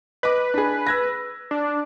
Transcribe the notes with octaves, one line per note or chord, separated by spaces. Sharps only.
B4 D#5 D6
D4 G#4
E6 G#6 A#6
D4